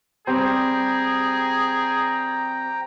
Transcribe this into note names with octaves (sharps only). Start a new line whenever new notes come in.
G3 C4 G4 G#4 G5 A#5